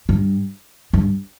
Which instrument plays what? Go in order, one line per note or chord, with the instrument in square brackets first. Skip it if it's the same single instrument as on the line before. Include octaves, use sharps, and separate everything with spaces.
[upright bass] G2
G2